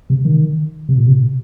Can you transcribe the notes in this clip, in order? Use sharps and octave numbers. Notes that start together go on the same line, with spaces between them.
C3
D#3
C3
A#2
C3